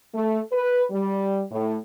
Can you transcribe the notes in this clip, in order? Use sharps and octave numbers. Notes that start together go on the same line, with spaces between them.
A3
B4
G3
A2